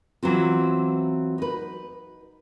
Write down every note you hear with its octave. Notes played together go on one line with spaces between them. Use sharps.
E3 F#3 B3 C4 F4
D#4 B4